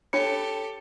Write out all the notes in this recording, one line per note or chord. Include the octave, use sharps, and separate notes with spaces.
D4 G4 A4 C#5 B5 C#7